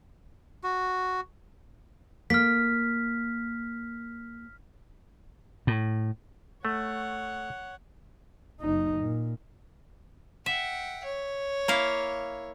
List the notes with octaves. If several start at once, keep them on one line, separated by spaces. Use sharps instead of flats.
F#4
A#3 F6 B6
A2
A3 C#5 F#5
F#1 D#4
A#2
E5 F#5 G5
C#5
A#3 E4 F5